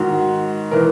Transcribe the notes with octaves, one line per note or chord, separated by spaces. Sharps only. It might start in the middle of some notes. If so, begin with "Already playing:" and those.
Already playing: G#2 D#3 F#4
E3 A#4